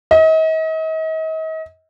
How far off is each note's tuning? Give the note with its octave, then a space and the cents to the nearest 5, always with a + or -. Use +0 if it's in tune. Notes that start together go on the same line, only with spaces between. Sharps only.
D#5 +40